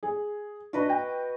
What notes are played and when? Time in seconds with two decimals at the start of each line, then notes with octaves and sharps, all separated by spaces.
0.03 G#4
0.73 D4 F#4 B4 D#5
0.89 G5